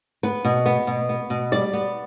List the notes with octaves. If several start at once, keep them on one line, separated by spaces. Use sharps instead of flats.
B3 B4
B2
B3
B2
B3
B2
G3 D5
B3